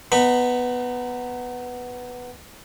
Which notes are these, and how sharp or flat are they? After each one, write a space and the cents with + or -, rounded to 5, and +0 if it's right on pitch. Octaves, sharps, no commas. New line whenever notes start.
B3 +0 D#4 -25 B5 +0